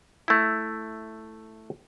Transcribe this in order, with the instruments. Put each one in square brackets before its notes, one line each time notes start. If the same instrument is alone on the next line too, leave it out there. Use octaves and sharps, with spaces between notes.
[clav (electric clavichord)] A3 E4